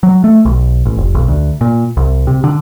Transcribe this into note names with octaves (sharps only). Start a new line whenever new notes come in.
F#3
A3
B1
A1
F1
B1
D2
A#2
C2
C3
D3